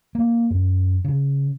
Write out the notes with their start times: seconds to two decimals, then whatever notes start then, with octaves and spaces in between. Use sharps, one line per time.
0.15 A#3
0.50 F#2
1.05 C#3